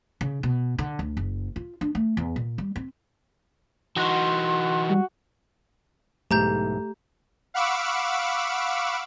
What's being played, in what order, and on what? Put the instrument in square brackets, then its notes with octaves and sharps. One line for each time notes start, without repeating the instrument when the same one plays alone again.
[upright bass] C#3
B2
D3
D2
F#1
F4
D4
A3
E2
A#2
G3
C4
[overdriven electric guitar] E3 D#4 [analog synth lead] F#4 [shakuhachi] C6
[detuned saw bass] G3
[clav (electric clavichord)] B1 G#2 E3 [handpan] A3 [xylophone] G4 A#5 G6
[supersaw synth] F5 F#5 B5 C#6 D6 E6